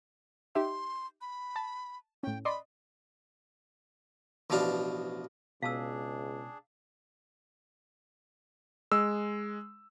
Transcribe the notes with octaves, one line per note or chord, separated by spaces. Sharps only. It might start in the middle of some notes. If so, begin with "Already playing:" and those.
D#4 G4 E5 C6
B5
A5
A2 C#4 G5
D5 D#5 B5 C6
A1 B2 F3 D4 F5
C#2 B2 D4 G#4 F5 A5 E6
G#3 E6